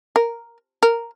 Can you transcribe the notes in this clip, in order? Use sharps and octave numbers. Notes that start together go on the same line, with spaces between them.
A#4
A#4